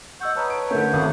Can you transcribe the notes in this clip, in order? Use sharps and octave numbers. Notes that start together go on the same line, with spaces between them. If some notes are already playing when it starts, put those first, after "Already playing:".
D#5 F#5 C#6 E6 G6
B4 C#5 A5 A#5 D#6
D7
D3 A3 C#4 A#4 G6
G#1 C3 A3 F5 F#5 D#6